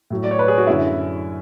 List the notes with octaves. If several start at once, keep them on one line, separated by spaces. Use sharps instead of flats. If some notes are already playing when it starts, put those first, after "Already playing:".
A2 F#3
D5
C#5
B4
G#4
F#4
F#2 D3 F#3 E4